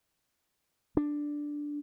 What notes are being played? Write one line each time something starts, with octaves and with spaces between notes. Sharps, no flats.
D4